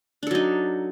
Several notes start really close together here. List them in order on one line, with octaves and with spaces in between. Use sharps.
D4 A4 F#3 D#4